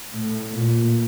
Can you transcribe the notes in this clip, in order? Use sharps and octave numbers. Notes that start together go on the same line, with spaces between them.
A2
A#2